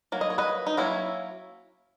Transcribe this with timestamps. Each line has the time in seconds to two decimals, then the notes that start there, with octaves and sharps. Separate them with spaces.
0.12 F#3 A#3
0.21 D#5
0.30 C#5
0.38 B4 D#5
0.67 D#4
0.77 F#3 A#3 C#4 E4